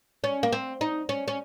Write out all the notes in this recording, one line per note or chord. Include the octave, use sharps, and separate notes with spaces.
C#4
A#3
C4
D#4
C#4
C#4